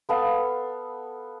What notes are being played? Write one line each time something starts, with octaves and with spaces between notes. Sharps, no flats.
B3 A4 F5